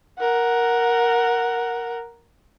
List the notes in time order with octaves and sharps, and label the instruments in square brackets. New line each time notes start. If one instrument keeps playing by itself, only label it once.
[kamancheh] A#4 F#5